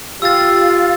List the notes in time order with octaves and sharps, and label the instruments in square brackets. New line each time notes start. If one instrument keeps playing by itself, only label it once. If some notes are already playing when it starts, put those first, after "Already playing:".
[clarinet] F4 [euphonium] G4 [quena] F5 [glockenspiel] E6 A6